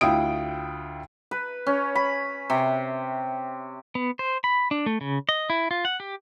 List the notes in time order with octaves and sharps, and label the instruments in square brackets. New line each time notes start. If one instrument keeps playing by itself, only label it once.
[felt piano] D2 E4 F4 G5 D#6 D7
[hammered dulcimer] B4
C#4
B5
C3
[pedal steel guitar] B3
C5
B5
D4
A3
C#3
D#5
E4
F4
F#5
G4